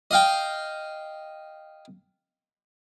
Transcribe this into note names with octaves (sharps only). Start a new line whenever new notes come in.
D#5 F5 G5